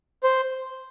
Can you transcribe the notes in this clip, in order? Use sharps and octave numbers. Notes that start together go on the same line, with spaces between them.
C5